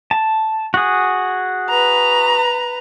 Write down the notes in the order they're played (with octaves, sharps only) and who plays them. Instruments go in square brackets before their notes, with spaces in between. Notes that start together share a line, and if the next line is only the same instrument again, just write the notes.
[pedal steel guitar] A5
F#4 G#4
[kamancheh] B4 A#5